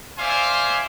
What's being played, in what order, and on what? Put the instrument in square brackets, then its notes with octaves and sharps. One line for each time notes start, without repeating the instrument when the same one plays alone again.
[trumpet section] C5 D5 E5 F5 G#5 C6